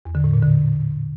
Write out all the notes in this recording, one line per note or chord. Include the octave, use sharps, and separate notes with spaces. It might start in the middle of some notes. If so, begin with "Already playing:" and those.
E2
D3
A2
A#2
D3